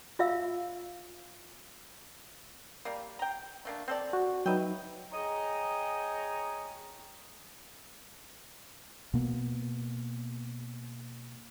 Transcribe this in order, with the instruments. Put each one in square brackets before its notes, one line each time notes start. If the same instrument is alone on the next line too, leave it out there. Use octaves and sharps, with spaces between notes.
[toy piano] F4 E5 F5 E6
[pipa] G3 A#3
G5 A#5
A3 A#3 D4
C4 A4 D5
[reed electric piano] F#4
[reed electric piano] F#3 D#4 [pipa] B4 E5 G5
[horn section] G#4 C#5 D#5 G5 A#5
[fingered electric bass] B2 A#3 B3